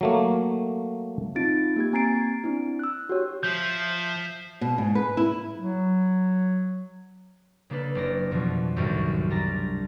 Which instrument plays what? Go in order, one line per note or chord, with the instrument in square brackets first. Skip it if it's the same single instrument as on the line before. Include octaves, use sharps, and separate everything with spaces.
[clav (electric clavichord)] F#3 A3 A#3
[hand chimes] C4 D#4 F4 A6 D7
A#3 G4 G#6
C4 G#5 A#5 A6 C7 D7
C4 D4 E4
E6 F#6
F#4 G4 C#5
[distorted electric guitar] F3 [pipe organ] C5 E5 [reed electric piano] G6
[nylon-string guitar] B2
G#2
B4
E4
[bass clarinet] F#3
[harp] C#3 A#3 D4 A4 B4
F#1 D5 A#6
F2 B2 E3
C2 F#2 A2 D#3 G3 C4
G3 D4 A#5 A6 A#6